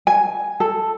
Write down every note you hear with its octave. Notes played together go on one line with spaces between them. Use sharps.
G#5
A4